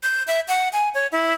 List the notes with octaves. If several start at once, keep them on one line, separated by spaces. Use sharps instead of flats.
G6
E5
F#5
G#5
C#5
E4